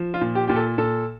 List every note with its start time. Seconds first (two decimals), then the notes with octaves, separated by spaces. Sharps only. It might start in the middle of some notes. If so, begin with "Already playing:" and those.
Already playing: F3
0.14 F4
0.21 A#2
0.35 G4
0.47 A#2 G4
0.56 A4
0.78 A#2 A4